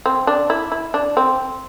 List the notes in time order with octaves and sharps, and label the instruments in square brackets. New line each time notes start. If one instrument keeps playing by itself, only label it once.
[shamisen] C4
D4
E4
E4
D4
C4